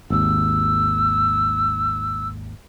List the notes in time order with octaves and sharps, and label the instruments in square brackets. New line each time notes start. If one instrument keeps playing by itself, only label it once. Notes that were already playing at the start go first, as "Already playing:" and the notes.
[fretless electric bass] G#1 D#2 [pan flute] E6